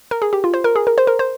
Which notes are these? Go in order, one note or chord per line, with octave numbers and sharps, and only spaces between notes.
A#4
G#4
G4
F4
C5
A#4
G#4
A#4
C5
A#4
C5